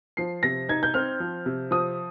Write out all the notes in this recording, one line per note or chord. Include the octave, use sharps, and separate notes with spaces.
F3 C7
C3 A#6
D#4 G#6
G6
C4 F6
F3
C3
F3 D#6